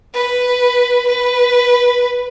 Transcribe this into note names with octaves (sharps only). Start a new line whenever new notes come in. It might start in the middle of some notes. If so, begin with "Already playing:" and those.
B4
B4